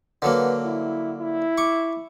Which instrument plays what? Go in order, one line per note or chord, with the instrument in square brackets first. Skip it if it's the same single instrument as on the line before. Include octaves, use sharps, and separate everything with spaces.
[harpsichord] D3 F#3 A#3 [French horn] B4
[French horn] E4
E4
[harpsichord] C#6 D6